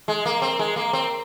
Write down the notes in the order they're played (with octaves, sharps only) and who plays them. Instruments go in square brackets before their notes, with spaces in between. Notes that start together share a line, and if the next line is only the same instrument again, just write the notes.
[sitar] G#3
A#3
C4
G#3
A#3
C4